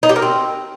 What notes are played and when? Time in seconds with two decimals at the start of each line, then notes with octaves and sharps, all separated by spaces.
0.03 D#4
0.09 G4
0.16 A#4
0.22 C4